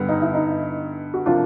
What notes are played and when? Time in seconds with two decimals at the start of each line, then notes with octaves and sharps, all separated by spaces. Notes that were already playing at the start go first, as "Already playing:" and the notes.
Already playing: G2 D3 G3 B3
0.09 D#4
0.22 E4
0.34 D#4
1.14 F#4
1.26 C3 F3 A#3 D4 F4